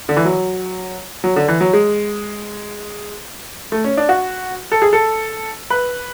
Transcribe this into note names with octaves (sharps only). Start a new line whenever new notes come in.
D3
E3
F#3
F#3
D3
E3
F#3
G#3
A3
C#4
D4
F#4
A4
G#4
A4
B4